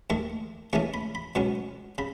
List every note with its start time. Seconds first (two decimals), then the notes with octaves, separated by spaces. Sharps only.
0.10 D#2 D#3 A3 C#6
0.73 D#2 C#3 E3 A3 C#4 C#6
0.94 B5
1.15 B5
1.35 C#2 B2 F#3 C#4 C#6
1.98 C#3 B5